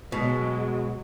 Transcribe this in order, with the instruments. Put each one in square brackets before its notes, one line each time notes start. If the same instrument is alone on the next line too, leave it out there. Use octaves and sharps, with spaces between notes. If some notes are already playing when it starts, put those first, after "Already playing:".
[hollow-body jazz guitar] B2 [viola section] F#3 G#3